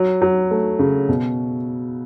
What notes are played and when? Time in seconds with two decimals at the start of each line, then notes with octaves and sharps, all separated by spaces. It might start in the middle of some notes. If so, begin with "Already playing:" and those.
Already playing: F#3
0.22 F#3
0.51 A3
0.79 C#3
1.09 B2